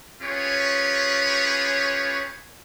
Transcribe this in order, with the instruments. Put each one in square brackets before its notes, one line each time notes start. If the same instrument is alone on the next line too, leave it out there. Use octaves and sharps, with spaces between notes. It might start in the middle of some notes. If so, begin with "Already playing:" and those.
[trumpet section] C#4 F4 G4 G#4 B4 C#5